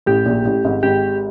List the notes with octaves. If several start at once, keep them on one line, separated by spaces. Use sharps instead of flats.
A1 A2 G4
A#1 A#2
A1 A2
G#1 G#2
G#1 G#2 G4